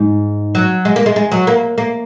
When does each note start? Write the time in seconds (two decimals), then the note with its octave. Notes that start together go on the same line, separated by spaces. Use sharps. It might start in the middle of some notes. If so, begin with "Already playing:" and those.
Already playing: G#2
0.55 F#3
0.85 G#3
0.96 A#3
1.06 G#3
1.16 G#3
1.32 F#3
1.47 A#3
1.78 A#3